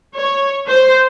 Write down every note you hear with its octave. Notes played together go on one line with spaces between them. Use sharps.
C#5
C5